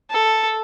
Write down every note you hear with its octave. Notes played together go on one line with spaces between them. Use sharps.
A4